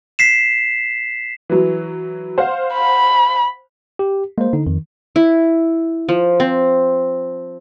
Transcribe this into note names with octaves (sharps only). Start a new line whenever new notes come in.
B6 C7 E7
E3 F#3
C5 F5 F#5
B5
G4
G#3 A#3 C5
D3 D#4
F2 D#3
E4
F3
C4